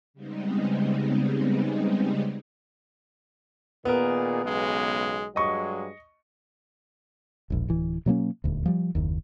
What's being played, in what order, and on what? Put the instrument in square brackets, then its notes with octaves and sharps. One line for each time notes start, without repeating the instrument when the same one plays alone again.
[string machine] C#3 G3 G#3 B3 C4 D#4
[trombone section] A#2 D#3 G#4 [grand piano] B3 A#4
[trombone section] B1 C#3 G#3
[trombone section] G2 F#3 G#3 [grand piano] D#5 C#6
[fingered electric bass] E1 A#1
D1 E3
B2 F#3 A#3 C#4
D#1 D2
F3 G3
F#1 D#2